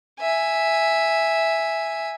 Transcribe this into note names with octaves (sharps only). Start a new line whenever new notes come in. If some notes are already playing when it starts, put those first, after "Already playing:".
E5 G#5